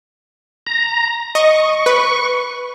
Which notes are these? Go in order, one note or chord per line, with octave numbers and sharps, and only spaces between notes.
A#5
D#5 C#6
B4